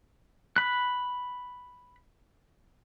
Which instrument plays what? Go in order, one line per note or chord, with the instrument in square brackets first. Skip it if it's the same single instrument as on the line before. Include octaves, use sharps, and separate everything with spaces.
[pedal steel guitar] B5 F#6